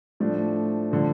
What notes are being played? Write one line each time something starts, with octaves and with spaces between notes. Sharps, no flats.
A2 F3 A3 D4
D3 F3